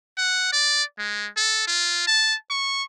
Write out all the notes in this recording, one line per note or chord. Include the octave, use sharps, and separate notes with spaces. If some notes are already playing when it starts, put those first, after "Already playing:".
F#5
D5
G#3
A4
F4
A5
C#6